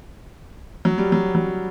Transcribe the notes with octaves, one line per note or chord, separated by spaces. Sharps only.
F#3
G3
F#3
F#3